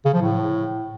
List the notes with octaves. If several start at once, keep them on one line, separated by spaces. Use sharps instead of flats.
C#3
F3
A2